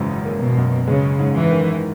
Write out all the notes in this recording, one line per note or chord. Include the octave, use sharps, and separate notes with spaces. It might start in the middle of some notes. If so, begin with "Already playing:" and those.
Already playing: G#1 F#2 C#3 E3
A#3
B2
F#2
C#3 G#3
G#2
E3
D#3